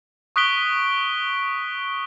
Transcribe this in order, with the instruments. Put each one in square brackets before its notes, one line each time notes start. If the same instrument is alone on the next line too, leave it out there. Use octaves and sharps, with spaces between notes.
[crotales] C#6 D#6 F#6 B6 D7 G7